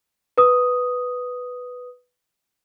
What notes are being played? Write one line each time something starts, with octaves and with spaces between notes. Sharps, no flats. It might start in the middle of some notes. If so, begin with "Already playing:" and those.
B4 D#6